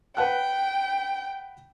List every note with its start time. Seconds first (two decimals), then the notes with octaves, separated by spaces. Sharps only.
0.17 B4 F#5 G5 F#6